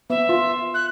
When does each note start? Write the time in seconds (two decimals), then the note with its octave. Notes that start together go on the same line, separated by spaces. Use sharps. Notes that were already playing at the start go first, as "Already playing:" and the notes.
0.10 B3 E5
0.29 F4
0.74 F#6